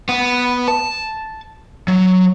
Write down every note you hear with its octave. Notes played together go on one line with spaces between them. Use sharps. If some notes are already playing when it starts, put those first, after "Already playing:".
B3
A5
F#3